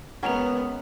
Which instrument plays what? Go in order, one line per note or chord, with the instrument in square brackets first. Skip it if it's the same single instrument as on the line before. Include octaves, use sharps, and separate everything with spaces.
[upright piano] C#2 A#4 A#5 [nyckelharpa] B3 [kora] C#4 [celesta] F#5 F7